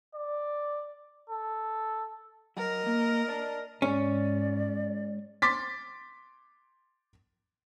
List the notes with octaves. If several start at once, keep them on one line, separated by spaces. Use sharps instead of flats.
D5
A4
F#3 A#4 D#5
A#3
D5 A5
G#2 G#3 C#4 D5
C6 D6 A6 B6